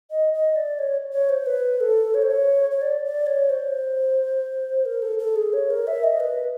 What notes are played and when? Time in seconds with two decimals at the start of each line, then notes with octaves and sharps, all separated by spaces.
0.11 D#5
0.34 D#5
0.56 D5
0.79 C#5
1.12 C#5
1.29 C5
1.46 B4
1.80 A4
2.14 C#5
2.22 C5
2.30 C#5
2.71 C#5
2.82 D5
3.05 D5
3.26 C#5
3.50 C5
4.85 A#4
5.02 A4
5.19 A4
5.36 G#4
5.53 C#5
5.70 A#4
5.87 E5
6.04 D#5
6.20 B4